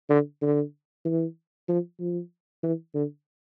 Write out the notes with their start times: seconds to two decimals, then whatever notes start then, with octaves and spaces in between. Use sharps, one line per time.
0.10 D3
0.42 D3
1.05 E3
1.69 F3
2.00 F3
2.63 E3
2.94 D3